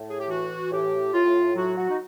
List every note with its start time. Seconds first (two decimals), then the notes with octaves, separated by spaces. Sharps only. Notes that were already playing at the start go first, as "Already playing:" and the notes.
Already playing: A2
0.09 G#4
0.19 G4
0.30 E3 F#4
0.71 A2 G4
1.14 A2 F4
1.55 F#3 F#4
1.77 F#4
1.89 D#4